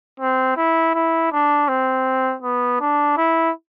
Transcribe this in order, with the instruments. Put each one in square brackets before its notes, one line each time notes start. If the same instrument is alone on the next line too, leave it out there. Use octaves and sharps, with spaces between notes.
[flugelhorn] C4
E4
E4
D4
C4
B3
D4
E4